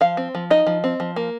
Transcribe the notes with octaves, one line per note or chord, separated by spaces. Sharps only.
F3 F5
C4
F3
D#4 D#5
F3
C4
F3
A#3